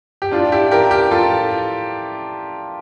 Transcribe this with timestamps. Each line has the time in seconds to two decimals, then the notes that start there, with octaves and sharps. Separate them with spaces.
0.22 G4
0.32 A2 D4 F4
0.52 E4 G4
0.71 E3 G4 A#4
0.91 G4 A#4
1.11 A2 F4 A4